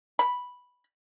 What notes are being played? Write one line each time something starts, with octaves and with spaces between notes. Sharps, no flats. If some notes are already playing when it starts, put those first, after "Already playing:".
B5